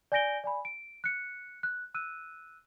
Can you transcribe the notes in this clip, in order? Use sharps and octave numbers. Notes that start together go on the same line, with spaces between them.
D5 G#5 G6 A#6 D7 G7
D5 G#5 B5
D7
F#6 C#7
F#6
E6 F#6 D#7